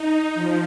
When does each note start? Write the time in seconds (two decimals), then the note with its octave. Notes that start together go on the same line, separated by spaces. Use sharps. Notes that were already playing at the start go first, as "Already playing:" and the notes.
Already playing: D#4
0.35 F3